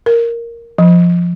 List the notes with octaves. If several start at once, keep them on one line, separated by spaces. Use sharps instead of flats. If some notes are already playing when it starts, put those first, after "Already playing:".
A#4
F3